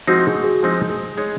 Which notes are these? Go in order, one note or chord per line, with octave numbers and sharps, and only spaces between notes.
F3 G#3 C4 D#4 F#4
G#4
G#4
F3 G#3 C4 D#4 G#4
G#4
G#3 D#4 G#4 C#5